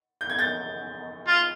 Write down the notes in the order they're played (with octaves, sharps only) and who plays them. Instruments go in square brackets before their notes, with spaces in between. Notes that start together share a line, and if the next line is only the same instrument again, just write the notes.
[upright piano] G6
G#6
G6 A6
[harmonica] F4